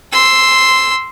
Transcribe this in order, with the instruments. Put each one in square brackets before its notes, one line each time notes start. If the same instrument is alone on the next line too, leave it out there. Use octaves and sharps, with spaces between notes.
[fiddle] C6 E6